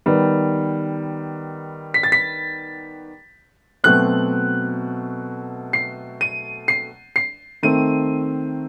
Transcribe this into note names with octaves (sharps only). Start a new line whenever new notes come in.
D#3 G3 B3
B6
A6
B6
B2 F#3 A3 C4 F#6
C7
D#7
C7
C7
D#3 A3 C4 D#7